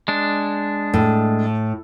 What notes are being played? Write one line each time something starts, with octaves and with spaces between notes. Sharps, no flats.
G#3 D4
A2